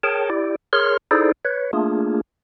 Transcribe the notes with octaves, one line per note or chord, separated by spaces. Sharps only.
G#4 A#4 C#5 G5 A5
E4 G4 D5
G#4 A#4 C#5 C6 F6
D#4 E4 G#4 A4 C5 D5
B4 C#5
A3 A#3 D4 F4 G#4